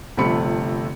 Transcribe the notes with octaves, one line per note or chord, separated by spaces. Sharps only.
G1 C3 F3 A3 B5 C#7